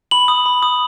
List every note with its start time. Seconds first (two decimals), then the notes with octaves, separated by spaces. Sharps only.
0.11 B5 F#7
0.28 D#6
0.46 B5
0.63 D#6